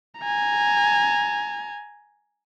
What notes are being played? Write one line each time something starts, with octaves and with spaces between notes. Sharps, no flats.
G#5 A#5